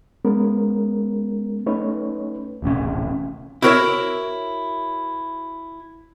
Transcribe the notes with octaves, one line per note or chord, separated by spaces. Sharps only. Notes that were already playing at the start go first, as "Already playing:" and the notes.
G#3 B3 C#4 A#4
A3 C#4 D#4 B4 C#5
D#1 A1 C3 C#4
E4 F#4 A#4 B4 C#5 E5